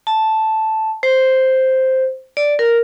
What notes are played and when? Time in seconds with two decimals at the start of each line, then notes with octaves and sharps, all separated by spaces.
0.07 A5
1.03 C5
2.37 D5
2.59 A#4